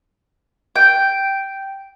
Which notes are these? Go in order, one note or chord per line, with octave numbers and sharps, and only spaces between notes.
G5